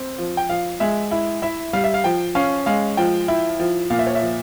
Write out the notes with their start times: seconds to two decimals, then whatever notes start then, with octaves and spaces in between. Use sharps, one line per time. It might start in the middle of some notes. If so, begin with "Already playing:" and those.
Already playing: C4
0.18 F3
0.37 G5
0.49 F3 F5
0.80 G#3 E5
1.11 E4
1.42 E4 E5
1.73 G3 F5
1.84 E5
1.94 F5
2.04 F3 G5
2.35 C#4 F5
2.66 G#3 F5
2.97 F3 G5
3.28 E4
3.60 F3
3.90 A#2 F5
3.99 E5
4.07 C#5
4.15 E5
4.21 F3